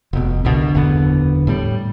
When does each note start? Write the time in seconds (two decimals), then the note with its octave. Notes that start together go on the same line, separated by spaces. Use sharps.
0.13 F1 B2
0.45 C2 B2 D3
0.75 F#1 E2 D3 B3
1.47 A2 G3